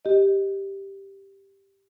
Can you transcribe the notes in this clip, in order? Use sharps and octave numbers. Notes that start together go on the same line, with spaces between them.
G4 D#5